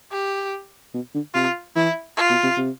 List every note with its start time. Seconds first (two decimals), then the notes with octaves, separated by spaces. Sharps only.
0.12 G4
0.94 B2
1.14 D3
1.34 C3 F4
1.76 E3 E4
2.17 F4
2.30 B2
2.43 C3
2.57 C3